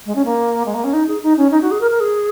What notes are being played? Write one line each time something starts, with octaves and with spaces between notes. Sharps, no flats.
G#3
C#4
A#3
G#3
A#3
C#4
D#4
G#4
D#4
C#4
D#4
F#4
G#4
A#4
A#4
G#4